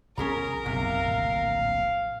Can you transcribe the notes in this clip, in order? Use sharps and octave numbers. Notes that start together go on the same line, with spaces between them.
C2 F3 C#4 G#4 A#4 A#5
F#1 B1 C3 D#3 F5
D1 A#1